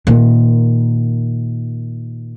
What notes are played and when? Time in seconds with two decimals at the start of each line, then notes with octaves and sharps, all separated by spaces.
0.07 A#2 D#3